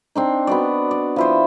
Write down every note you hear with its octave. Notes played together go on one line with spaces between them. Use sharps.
C4 D4 D#4
B3 F#4 D5
D5
F3 E4 C5